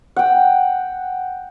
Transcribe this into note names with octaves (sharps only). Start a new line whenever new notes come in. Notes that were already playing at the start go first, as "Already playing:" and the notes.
F#5 G5